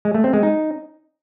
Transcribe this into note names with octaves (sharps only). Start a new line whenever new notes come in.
G#3
A3
C4
G#3
D#4